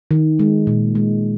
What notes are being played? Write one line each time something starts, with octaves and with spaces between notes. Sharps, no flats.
D#3
G#3
A#2
G#3